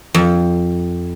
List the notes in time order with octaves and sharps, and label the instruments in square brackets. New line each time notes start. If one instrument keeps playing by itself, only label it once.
[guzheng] F2